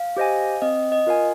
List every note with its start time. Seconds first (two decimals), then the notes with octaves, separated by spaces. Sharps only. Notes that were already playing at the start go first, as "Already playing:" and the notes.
Already playing: F5
0.17 G4 C5 D#5 G#5
0.62 C4 D#5
0.92 D#5
1.07 F4 A#4 F5 G#5